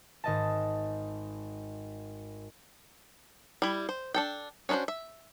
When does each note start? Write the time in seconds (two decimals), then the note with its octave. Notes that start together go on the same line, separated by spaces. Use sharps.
0.24 G#1 D#5 A5
3.62 G3 E4
3.89 C5
4.14 D4 A4 G5
4.69 C#4 D4 E4 F#4 C5
4.88 E5